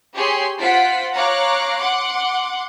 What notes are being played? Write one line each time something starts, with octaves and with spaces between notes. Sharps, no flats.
G4 G#4 C#5 C6
F4 C5 F#5 B6 D7
C#5 F5 A#5 D6 F#6
F#5 C6 D6